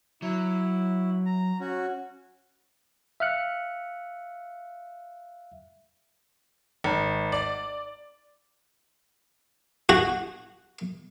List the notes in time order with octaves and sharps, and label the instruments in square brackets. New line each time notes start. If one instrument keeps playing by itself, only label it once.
[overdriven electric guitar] F#3 [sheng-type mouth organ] E4
[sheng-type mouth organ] A#5
C#4 F#4
[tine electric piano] E5 F5 F6 F#6 C#7
[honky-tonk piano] G#1
D5
[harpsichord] F#4